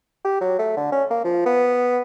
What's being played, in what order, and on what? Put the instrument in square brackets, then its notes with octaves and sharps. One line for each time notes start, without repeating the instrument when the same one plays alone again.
[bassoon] G4
F#3
A3
D3
C#4
A#3
F3
B3